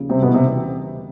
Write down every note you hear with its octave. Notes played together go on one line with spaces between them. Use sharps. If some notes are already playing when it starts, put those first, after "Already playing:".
Already playing: D#2 C#3 F3
C3 G3 C4
B2 B3
E3
C3 C4